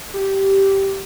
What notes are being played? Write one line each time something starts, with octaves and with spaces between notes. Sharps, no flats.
G4